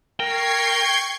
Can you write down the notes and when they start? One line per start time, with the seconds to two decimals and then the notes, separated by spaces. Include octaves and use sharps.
0.20 A#4 G5 C#6 G#6 C7